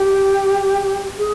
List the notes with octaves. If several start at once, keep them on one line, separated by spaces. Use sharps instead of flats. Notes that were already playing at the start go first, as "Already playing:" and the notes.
Already playing: G4
G#4